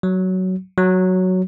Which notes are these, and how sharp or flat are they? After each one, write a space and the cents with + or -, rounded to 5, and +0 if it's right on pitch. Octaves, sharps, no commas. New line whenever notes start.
F#3 +10
F#3 +0